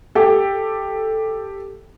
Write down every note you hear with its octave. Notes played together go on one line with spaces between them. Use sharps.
G4 A4